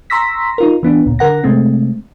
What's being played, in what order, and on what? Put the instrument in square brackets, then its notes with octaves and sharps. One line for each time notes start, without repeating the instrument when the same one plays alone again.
[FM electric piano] A#5 C6 C#6 E6 A#6 B6
D#4 F4 A#4
E3 B3 D4
C#2 A#2
D3 A#4 F#5 A#6
C3 G#3 A3 C4